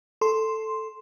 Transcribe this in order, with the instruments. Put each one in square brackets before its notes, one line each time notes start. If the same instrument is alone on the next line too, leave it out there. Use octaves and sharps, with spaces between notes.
[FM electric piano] A4 C6